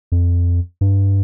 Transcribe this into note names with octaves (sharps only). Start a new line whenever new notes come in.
F2
G2